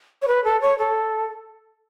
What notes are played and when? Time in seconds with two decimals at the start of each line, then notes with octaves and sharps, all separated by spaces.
0.22 C#5
0.28 B4
0.44 A4
0.61 C#5
0.79 A4